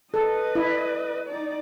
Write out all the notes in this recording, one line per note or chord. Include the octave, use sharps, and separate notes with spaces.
A4 B4 D#5
E4
D#4 D5